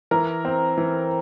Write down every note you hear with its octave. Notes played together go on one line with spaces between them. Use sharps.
E3 A#4
C4
E3